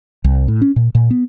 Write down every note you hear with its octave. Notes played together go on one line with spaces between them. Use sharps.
C2
A2
C#4
A#2
A#2
B3